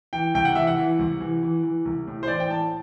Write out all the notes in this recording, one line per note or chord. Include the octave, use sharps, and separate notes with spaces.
E3 G5
C2 G5
F#5
E3 E5
F#5
E3
C2
E3
E3
E3
C2
A2
C5
E3 D5
G5
A2 A5